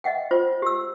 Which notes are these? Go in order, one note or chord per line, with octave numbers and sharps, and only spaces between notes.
D#5 E5 F#5 G5
F4 C5
G4 E6